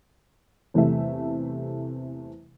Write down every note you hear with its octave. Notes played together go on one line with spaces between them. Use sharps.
E2 C3 E3 G3 A3 E5